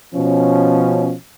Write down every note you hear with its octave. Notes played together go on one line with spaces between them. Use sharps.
B2 F3 C#4